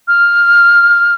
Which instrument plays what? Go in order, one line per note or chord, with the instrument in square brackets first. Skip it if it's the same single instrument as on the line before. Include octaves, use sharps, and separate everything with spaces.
[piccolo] F6